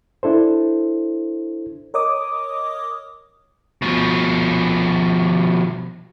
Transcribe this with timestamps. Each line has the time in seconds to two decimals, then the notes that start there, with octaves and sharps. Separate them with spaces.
0.23 D4 E4 A4 C5
1.94 A#4 C#5 D#5 D6 D#6
3.82 B2 F3